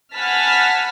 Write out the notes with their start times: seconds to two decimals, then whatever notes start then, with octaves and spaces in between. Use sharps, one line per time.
0.15 F#5 G#5 A5 B5 F6 B6